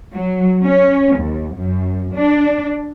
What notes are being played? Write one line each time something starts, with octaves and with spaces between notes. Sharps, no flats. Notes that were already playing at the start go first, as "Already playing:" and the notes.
F#3
C#4
D#2
F#2
D4